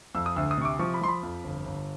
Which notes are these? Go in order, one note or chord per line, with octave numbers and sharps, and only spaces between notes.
F2 E6
D#6
D2 E6
D#6
C3 C#6
D6
F3 C#6
B5
F3 C6
B5
F2
G1
G1